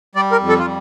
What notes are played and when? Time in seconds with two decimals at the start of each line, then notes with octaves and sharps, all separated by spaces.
0.15 G3 D5
0.32 A#4
0.40 F2
0.49 A4
0.59 F4
0.65 G3